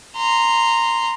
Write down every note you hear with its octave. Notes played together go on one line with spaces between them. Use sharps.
A#5 C6